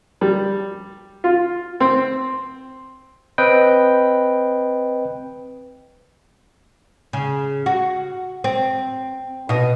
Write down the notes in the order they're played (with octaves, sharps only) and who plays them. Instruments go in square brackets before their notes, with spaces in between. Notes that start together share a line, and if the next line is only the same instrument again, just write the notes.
[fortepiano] G3
F4
C4
[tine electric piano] C4 B4 D#5 G5
[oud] C#3
F#4
C4
B2 D#5